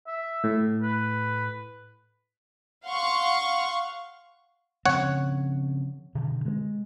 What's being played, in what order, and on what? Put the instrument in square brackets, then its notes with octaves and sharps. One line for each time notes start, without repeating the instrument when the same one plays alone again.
[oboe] E5
[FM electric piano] A2
[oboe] B4
[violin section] F5 F#5 C6 C#6
[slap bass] C#3 F3 C4 [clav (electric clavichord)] C#5 F#5
[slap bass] B2 D3 D#3
G#3